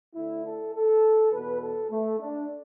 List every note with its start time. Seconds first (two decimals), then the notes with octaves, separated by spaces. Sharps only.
0.15 D2 D3 E4
0.43 A4
0.73 A4
1.32 E2 B2 B4
1.60 A4
1.90 A3
2.20 D4